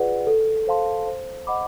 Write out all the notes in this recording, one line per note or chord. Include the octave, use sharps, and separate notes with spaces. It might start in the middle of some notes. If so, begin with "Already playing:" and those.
Already playing: F4 G#4 B4 D5 F#5
A4
C5 F5 A5 C6
C5
D#5 F#5 B5 D6